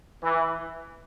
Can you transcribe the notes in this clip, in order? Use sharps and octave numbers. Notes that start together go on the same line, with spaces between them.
E3